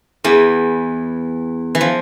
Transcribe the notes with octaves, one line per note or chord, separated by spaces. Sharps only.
E2 E3
E3
F3